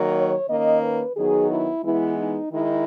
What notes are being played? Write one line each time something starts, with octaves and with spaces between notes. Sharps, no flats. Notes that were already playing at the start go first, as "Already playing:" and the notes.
Already playing: D#3 F#3 A#3
C#5
D#3 A#3 C#4 D#5
B4
D#3 F#3 B3 D#4 G#4
E4
E3 G#3 B3 E4
D#4
D#3 G#3 D#4 E4